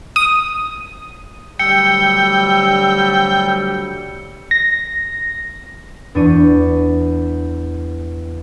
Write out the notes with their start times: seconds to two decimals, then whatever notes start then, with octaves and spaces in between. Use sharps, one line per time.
0.16 D#6
1.59 D2 F#3 G3 G5 E6 C#7
4.51 A#6
6.15 E2 D4 C#6 D#7